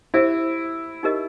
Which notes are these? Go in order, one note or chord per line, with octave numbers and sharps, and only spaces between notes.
E4 G4 C5 E5
D#4 G4 A#4 D#5